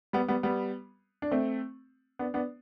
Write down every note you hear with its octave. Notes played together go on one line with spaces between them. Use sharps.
G3 B3
G3 B3
G3 B3
D4
A3 C4
B3 D4
B3 D4